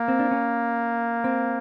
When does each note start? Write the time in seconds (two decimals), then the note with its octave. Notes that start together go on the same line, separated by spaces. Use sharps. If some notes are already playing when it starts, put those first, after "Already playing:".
Already playing: A#3
0.08 C4
0.19 D4
0.31 C#4
1.24 C4